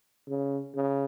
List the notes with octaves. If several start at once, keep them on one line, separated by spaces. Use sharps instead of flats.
C#3
C#3